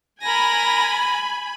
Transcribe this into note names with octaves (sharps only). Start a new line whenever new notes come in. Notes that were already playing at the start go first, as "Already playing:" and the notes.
A#4 G#5 B5 A#6